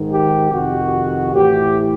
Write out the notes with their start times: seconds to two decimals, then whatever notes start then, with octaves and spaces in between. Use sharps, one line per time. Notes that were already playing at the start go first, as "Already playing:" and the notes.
Already playing: G#2 D#3
0.10 G4
0.51 F2 C3 D#3 F#4
1.33 A2 E3 G4